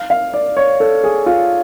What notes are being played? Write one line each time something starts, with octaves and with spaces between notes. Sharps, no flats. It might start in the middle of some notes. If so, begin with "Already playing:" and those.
Already playing: F5
F5
D5
C#5
A4
G#4
F4